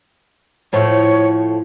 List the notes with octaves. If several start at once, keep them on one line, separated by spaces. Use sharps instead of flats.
A2 F3 A3 C#5